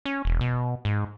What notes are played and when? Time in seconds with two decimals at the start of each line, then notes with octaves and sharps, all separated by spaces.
0.05 C#4
0.25 E1
0.41 B2
0.85 G#2